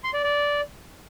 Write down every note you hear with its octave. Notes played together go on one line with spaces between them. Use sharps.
C6
D5
D5